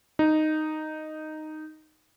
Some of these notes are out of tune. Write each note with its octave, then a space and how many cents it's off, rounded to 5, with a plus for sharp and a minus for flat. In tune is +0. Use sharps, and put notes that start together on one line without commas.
D#4 -5